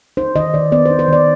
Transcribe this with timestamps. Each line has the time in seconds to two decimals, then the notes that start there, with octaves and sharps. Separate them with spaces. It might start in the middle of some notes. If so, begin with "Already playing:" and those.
0.17 D#4 C5
0.36 D#3 D#5
0.54 D#3 D5
0.72 B3 D5
0.86 C5
0.90 D#4
0.99 C5
1.08 D#3 D5